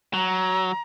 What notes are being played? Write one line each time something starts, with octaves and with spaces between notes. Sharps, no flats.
F#3 A#5